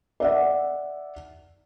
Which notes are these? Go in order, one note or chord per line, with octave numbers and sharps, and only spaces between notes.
D5 E5 F#5